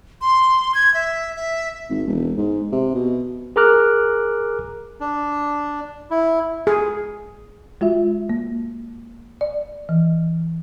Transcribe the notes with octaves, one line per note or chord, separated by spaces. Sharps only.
C6
G#6
E5
E5
G#1
E1
G#2
C3
B2
G#4 A#4 A#5 D6 F6 F#6
D4
E4
G#4
G#3 F4 F#4 E5
A#3
D5
E3